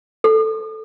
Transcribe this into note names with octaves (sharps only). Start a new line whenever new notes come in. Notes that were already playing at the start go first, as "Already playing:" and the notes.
A4